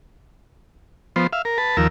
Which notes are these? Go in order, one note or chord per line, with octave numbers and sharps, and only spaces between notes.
F3 B3 C5
E5 F5
A#4
B4 A5
D#2 F3 A#4 E6